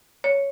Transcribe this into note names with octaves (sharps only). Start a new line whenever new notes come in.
C#5